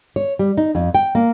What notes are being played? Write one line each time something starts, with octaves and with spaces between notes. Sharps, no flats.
C#5
G3
D#4
F2
G5
A#3